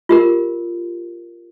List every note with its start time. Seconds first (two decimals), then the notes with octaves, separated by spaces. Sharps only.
0.09 F4 G4 A#4